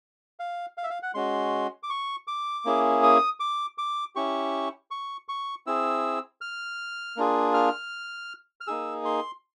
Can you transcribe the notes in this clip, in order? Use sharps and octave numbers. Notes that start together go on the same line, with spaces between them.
F5
F5
E5
F5
F#5
G#3 C#4 F#4 C6
D6
C#6
D6
A#3 C#4 E4 G#4
D#6
D6
D6
C#4 E4 G4 C#6
C#6
C#6
C4 E4 G#4 E6
F6
A#3 D4 F4 G#4
F6
F6
A#3 D#4 G#4 E6
C6